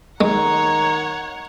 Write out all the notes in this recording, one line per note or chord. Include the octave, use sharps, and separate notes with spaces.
D#3 G#3 C#5 F#5 A#5